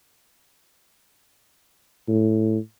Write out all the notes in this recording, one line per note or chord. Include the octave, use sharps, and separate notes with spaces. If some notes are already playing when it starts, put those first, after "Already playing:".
A2